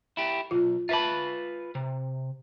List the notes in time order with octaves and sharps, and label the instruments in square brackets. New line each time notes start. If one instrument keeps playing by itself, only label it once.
[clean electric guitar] E4 G4
[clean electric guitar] B1 E2 [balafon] F4
[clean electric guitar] F4 B4 B5 [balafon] E5 A5
[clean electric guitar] C3